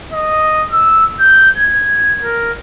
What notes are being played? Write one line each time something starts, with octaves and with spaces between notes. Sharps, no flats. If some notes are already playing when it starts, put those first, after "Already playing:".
D#5
E6
G6
G#6
A#4